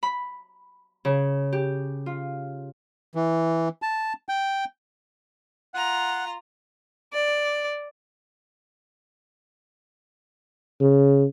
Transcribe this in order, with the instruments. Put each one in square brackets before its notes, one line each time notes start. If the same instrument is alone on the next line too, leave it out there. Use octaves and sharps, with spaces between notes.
[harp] B5
C#3
G4
F4
[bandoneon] E3
A5
G5
[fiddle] F4 A#5 [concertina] F#5
[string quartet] D5
[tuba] C#3